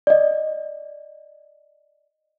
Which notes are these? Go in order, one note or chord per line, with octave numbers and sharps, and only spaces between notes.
D5 D#5